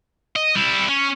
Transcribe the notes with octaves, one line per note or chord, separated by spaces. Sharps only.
D#5
G3 E4
C#4